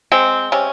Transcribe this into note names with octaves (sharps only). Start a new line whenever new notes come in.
G#3 C4
C3 C#4